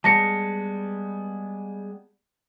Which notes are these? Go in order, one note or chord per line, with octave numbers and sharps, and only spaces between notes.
G3 G#3 B3 A5 A#6 C#7